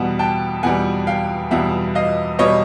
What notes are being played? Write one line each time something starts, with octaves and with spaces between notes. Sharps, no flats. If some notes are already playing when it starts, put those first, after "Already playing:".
Already playing: E2 B2 G3 F#5
G5 A5
E2 B2 G3 F#5 G#5
F5 G5
E2 B2 G3 E5 F#5
D#5 F5
B2 G3 C#5 D#5